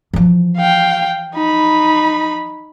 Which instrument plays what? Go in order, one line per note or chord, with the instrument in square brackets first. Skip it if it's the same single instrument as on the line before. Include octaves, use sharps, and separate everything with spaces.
[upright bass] E3 F3
[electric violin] F5 G5
D#4 B5